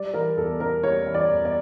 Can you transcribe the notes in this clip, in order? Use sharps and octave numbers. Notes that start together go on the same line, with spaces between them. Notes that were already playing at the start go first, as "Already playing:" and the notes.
Already playing: G3 D5
E3 A#4
E2 A4
C#3 A#4
G3 C#5
E3
D5
E2
D5